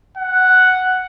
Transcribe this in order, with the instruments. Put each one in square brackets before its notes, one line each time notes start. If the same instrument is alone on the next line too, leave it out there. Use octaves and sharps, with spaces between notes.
[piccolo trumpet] F#5